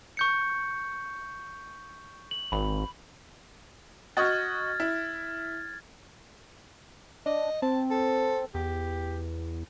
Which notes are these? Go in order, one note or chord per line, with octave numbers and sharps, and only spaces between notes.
C#6 G6 C#7
F#7
G#1 B5
F#4 D#5 C#6 F6 G#6 A6
E4
D4 D#5
C4 A5
A4
E2 G4